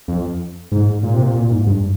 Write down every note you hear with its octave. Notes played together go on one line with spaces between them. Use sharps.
F2
G#2
A#2
C3
A#2
A#2
G#2
G2